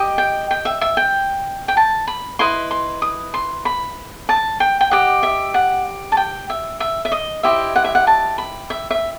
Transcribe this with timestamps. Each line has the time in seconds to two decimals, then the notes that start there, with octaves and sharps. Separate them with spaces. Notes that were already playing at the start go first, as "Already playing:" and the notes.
Already playing: G4 D#5
0.18 G5
0.51 G5
0.65 E5
0.81 E5
0.97 G5
1.68 G5
1.77 A5
2.07 B5
2.39 E4 B4 D#5 C6
2.71 C6
3.02 D#6
3.34 C6
3.65 B5
4.29 A5
4.60 G5
4.81 G5
4.91 G4 D#5 F#5
5.23 E5
5.54 F#5
6.12 A5
6.17 G5
6.50 E5
6.80 E5
7.05 E5
7.12 D#5
7.43 E4 G4 C5 D#5 E5
7.76 F#5
7.84 E5
7.95 F#5
8.07 A5
8.38 B5
8.70 E5
8.91 E5